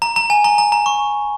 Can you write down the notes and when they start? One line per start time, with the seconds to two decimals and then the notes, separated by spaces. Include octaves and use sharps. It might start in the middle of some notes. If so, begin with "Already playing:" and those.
0.02 A#5
0.16 A#5
0.30 G#5
0.44 A#5
0.58 A#5
0.72 A#5
0.86 C#6